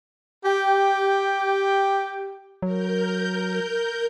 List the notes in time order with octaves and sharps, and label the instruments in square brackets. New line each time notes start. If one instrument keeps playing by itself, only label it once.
[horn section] G4 G5
[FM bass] F#3 [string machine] A#4 G6